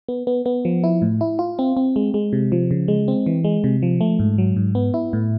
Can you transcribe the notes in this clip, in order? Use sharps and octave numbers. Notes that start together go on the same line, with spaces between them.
B3
B3
B3
F3
E4
A2
E4
F4
C4
C4
G#3
G#3
C3
F3
C#3
G#3
C4
E3
G#3
C3
F3
A3
G#2
F#3
G#2
B3
E4
A2